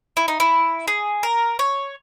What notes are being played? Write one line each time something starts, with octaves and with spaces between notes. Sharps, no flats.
E4
D#4
E4
G#4
A#4
C#5